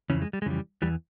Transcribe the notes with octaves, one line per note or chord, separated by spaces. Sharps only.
F2 C#3 E3 C#4
G#3
G3
G#3
F2 C#3 E3 G3
E2 E3 G3